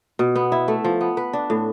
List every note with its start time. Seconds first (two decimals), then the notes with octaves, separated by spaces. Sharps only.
0.19 B2
0.36 B3
0.52 E4
0.68 A3
0.84 F3
1.01 B3
1.17 B4
1.33 D4
1.50 A2